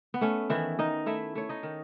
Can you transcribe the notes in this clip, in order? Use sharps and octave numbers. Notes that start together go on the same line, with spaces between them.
B3
A3 C#4
D#3 E3 E4
D#3 D#4 D#5
A3 E4 E5
A3 C#5
D#4 D#5
D#3